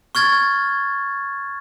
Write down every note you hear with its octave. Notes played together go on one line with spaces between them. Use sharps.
C#6 F6 G#6 A6